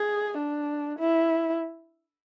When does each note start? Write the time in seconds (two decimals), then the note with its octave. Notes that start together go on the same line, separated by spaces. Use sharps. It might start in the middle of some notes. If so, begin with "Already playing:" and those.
Already playing: G#4
0.38 D4
0.99 E4